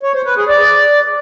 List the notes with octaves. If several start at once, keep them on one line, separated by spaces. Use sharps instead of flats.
C#5
C5
B4
G#4
D5